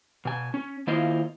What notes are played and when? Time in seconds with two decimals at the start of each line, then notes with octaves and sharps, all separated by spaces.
0.25 B2 G#5
0.54 C#4
0.87 D#3 A#3 E4 F4 C5 D#5